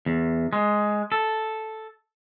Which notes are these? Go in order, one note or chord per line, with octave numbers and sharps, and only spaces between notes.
E2
G#3
A4